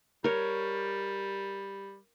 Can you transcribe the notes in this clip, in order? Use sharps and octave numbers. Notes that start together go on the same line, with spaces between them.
G3 A#4 C#5